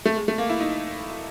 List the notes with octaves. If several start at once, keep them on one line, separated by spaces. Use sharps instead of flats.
A3
G#3
A3
A#3
E4
D#4